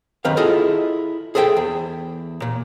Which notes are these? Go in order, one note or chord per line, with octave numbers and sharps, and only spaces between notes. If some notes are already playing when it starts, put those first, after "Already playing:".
F#2 D#3 C4 B4 F5
E4 F4 G#4 A4 D#5
G#4 A4 C5 E5 G5
E2
A#2